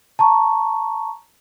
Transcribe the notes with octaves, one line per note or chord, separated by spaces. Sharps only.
A5 A#5 C#6